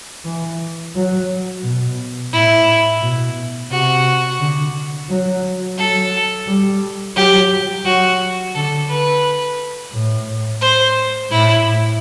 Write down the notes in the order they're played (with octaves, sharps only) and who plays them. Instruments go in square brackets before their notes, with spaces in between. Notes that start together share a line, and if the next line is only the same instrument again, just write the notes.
[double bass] E3
F#3
B2
[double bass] A2 [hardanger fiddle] E4
[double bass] B2
[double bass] C3 [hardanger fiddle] F#4
[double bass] D3
F#3
[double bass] F#3 [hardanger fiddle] A4
[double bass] G3
[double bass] F#3 [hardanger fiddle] G4
[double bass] F#3 [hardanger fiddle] F#4
[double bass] D3 [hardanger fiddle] A4
[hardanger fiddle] B4
[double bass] A2
[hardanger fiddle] C5
[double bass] A2 [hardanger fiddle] E4